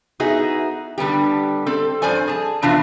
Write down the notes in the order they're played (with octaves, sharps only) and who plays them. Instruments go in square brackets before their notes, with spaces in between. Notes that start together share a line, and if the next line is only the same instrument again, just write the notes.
[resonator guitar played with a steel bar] B3 D#4 E4 F#4 G#4
D3 G3 B3 G4
C4 A4
G2 F3 C5 D5 G#5
G#4 A5
F2 B2 E3 D4 E4 F4